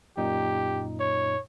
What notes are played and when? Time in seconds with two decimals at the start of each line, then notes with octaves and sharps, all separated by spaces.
0.17 F#2 A#2 D#4 G4
1.00 C#5